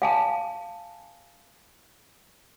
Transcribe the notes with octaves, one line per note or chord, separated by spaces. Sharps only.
F5 G#5 A5